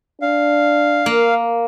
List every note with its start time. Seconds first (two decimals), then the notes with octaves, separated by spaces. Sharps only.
0.22 D4 F5
1.06 A#3